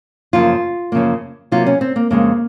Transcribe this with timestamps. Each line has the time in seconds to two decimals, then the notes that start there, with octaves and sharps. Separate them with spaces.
0.33 F#2 C#3 F3 A#3 F4
0.92 F#2 C#3 F3 A#3
1.52 C3 F#3 A#3 F4
1.66 C#4
1.81 C4
1.96 A#3
2.10 F2 C#3 G#3 A#3